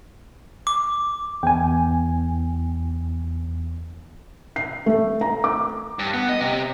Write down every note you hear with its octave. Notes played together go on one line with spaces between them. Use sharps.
D6
E2 G5 G#5
C7
A3
A#5
D6
G2
B3
D#5
C3